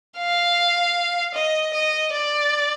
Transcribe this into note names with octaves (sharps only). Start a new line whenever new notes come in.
F5
D#5
D#5
D5